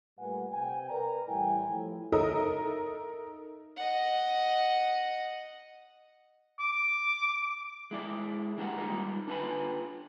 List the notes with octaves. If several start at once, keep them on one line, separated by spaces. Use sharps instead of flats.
A#2 G3 A3 B4 F#5 G#5
C3 G5 G#5
A#4 B4 D5 A#5
A2 E3 G3 E4 G5 G#5
A2 F3 E4
D#4 A4 A#4 D#5 E5 D#6
D#5 F#5
D6
G#3 E4 D5
G#3 D4 F#4 G4 A#4 F#5
G3 D#4 F4 A#4
D4 F4 B4 F5 G#5 B5